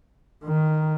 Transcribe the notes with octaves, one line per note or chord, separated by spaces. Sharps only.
D#3